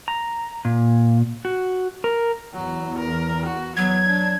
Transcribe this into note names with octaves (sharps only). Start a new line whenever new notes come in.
A#5
A#2
F#4
A#4
E2 F#3
A#4
F#4
F#3 B3 G#6
D4